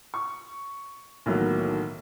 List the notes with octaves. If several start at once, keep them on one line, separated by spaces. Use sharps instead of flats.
C#6
B1 A2 D#3 E3 F#3 A#3